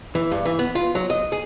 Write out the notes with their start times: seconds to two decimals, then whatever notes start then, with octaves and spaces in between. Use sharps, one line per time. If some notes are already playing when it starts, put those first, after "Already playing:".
0.15 E3
0.31 G2
0.45 E3
0.59 B3
0.75 F4
0.95 F#3
1.10 D#5
1.32 G#4